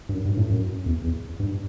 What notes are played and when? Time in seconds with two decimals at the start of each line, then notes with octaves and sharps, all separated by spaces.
0.09 G2
0.13 F#2
0.25 G2
0.37 A2
0.49 F#2
0.86 E2
1.04 E2
1.40 G2